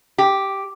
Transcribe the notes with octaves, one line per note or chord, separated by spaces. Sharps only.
G4